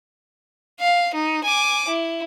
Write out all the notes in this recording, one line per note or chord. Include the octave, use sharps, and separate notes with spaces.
F5
D#4
G#5 D6
E4